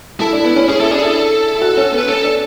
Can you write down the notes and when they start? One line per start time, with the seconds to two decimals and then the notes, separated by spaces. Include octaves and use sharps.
0.20 E4 A4
0.33 D4
0.45 B3
0.56 C#4
0.68 C#4 G#4
0.80 E4 A4
0.91 D4 G#4
1.03 E4 A4
1.55 E4
1.62 F#4
1.77 C#4
1.92 B3
1.98 B4
2.08 C#4 A4
2.24 D4